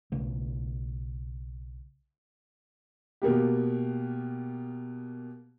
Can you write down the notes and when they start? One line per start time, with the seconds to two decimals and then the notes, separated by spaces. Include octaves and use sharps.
0.12 B1 C#3 A3
3.22 B2 A#3 B3 G4